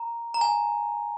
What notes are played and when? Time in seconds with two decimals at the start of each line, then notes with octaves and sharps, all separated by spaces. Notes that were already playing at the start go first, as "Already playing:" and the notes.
Already playing: A#5
0.34 A#5
0.41 G#5